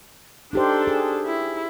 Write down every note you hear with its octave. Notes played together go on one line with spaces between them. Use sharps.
D4 D#4 G4 A4 C5
G#4
E4